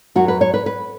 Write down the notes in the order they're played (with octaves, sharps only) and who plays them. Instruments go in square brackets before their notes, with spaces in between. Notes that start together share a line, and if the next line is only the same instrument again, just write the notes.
[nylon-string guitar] F#2 F#3 F#4
B4
C#5
B4
B4